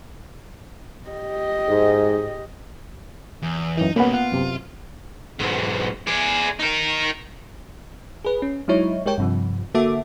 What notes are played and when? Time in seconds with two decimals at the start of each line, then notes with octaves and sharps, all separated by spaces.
1.08 G4 D#5
1.68 G#2
3.42 E2
3.77 F#2 E3 D#4
3.96 B2 G3 A#3 B3 C#4 B5
4.14 F4 F#5
4.32 F#2 C3
5.40 B1 G#2
6.07 G#4 D5
6.59 D#4 A#4
8.25 G#4 B4
8.42 C#4
8.68 F#3 G#3 D#4 E4 C#5
9.06 G#3 G4 A#4 C#5 G5
9.18 G2 C3 F3
9.74 D3 A#3 F#4 A4 E5 D6